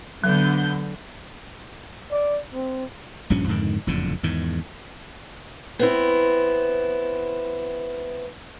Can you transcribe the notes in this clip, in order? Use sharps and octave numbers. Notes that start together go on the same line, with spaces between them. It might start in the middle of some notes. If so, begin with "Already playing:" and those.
D3 F#3 B3 G6
D5
C4
A#1 G2 F3 C#4
F2 G#2 D3 D#3
F#1 F2 A2 D3
E2 G#2 D#3
B3 C4 E4